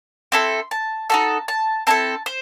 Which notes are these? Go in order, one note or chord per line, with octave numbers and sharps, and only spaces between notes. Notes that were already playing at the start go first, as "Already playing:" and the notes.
C4 E4 A4 C6
A5
D#4 F#4 A4 A5
A5
C4 E4 A4 A5
C5